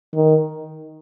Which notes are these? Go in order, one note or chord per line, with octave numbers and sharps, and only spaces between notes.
D#3